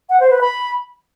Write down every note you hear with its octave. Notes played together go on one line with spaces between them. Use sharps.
F#5
C5
B4
B5